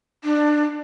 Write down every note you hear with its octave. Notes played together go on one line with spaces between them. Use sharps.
D4